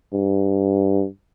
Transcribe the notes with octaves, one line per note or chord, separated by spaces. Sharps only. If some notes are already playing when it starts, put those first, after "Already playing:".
G2